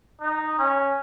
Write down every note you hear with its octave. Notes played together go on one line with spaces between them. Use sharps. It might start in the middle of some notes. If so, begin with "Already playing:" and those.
D#4
C#4